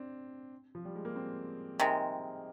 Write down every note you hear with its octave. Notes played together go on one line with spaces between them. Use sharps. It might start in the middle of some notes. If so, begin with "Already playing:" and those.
Already playing: C4 D4
F3
G3
G#3
A#3
C4
C3 D#3 G#3